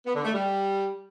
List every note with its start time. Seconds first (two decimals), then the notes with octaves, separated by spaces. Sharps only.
0.06 B3
0.15 D3
0.24 A3
0.33 G3